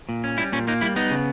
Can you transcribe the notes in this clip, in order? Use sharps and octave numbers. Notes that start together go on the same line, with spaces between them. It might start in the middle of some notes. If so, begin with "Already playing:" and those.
A#2
C#4
G3 E4
A#2 C#4
A#3 D#4
G3 E4
B3 D#4
C#3